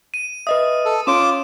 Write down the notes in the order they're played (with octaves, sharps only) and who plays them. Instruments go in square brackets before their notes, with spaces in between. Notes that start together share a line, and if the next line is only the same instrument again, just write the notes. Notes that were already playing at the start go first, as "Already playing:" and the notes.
[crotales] D#7
[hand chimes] B4 D#5 E5 [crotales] D#6
[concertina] A4
[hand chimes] C#4 C#5 D7 [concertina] F4 D6 [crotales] E7